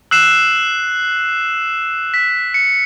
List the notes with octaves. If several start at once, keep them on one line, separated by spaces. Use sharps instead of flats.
E6 F#6 C7 E7
B6
C#7